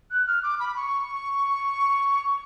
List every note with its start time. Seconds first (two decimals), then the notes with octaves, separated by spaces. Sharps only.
0.11 F#6
0.27 F6
0.43 D6
0.60 B5
0.76 C#6